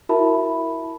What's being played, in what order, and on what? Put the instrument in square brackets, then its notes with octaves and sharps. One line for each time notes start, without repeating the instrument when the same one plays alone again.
[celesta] E4 F#4 A#4 E5 A5 B5